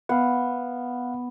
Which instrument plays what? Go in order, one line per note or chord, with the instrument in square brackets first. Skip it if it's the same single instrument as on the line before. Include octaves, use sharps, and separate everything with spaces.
[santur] B3 [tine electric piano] F5 F#5